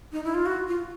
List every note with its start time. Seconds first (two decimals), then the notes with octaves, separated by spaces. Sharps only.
0.12 D#4
0.24 E4
0.34 F4
0.46 F#4
0.68 F4